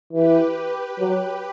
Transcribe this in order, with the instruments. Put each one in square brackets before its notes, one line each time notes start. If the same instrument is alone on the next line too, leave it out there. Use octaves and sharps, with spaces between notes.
[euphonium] E3 [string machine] G4 B4
[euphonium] F#3